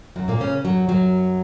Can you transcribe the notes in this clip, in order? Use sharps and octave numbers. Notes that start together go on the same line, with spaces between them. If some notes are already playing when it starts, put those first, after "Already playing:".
F#2 F#3
A#2 A#3
C#3 C#4
F#2 F#3
F#2 F#3